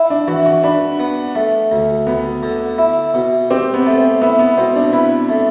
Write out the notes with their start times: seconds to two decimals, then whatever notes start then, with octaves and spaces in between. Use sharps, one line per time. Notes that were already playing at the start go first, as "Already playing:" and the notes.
Already playing: E4
0.10 D4
0.28 E3 F#4
0.46 F#4
0.63 D4 B4
0.99 B3
1.35 A3
1.72 D2
2.07 D2 B3
2.43 D3
2.78 E4
3.14 B2
3.50 C4 G4
3.74 B3
3.87 A3
3.98 C4
4.22 B3 E4
4.39 B3
4.57 B2 C4
4.76 D4
4.93 E4 B4
5.29 A3